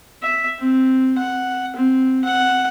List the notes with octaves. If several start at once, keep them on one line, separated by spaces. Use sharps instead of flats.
E5
C4
F#5
C4
F#5